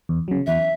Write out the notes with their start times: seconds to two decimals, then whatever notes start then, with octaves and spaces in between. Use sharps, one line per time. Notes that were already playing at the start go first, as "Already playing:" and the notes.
0.09 E2
0.28 C#3 F#3
0.47 E2 E5